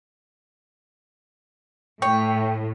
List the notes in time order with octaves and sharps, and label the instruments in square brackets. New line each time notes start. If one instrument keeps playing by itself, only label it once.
[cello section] A2 [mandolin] C#5 [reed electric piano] G5